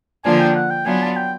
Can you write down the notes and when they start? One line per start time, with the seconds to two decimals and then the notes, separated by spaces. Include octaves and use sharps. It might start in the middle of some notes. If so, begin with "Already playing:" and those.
0.24 D3 F3 A#3 D4 F4 G#5
0.40 G5
0.55 F#5
0.70 G5
0.86 F#3 B3 D4 F4 G#5
1.02 A5
1.16 G5